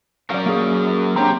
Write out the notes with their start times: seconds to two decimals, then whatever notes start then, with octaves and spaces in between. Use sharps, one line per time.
0.30 F#3 C#4 A#4 D5 F5
0.46 A#3 G#4
1.16 C4 D4 G4 C#5 A#5